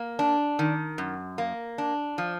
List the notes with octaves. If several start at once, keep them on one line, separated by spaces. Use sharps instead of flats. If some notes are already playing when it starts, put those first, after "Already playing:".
Already playing: A#3
D4
D#3
F#2
A#3
D4
F3